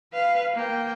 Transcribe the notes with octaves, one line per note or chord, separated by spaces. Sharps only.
B4 F5
A#3 G5